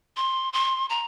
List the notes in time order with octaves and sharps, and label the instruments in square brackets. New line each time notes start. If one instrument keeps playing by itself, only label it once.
[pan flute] C6
C6
A#5